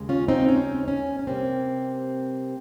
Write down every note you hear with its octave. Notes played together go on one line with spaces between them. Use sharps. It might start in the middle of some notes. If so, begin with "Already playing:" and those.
Already playing: D#2 C#3 G#3
C#4 F4
C4 D#4
C#4
C#4
C#4
C3 G3 A#3 C4